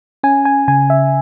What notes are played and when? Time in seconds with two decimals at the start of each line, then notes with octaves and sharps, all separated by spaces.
0.23 C#4 G#5
0.45 G#5
0.68 C#3 G#5
0.90 E5